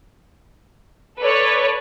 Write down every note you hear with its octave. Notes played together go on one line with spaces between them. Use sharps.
A4 B4 C#5 D5